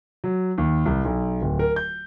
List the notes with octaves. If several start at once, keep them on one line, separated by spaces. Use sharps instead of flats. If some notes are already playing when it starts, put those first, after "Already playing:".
F#3
D#2
C2
B1
D1
A#4
G6